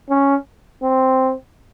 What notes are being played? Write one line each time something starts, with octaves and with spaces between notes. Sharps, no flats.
C#4
C4